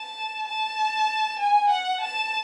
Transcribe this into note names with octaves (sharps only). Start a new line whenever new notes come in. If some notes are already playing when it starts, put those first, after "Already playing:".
Already playing: A5
A5
G#5
F#5
A5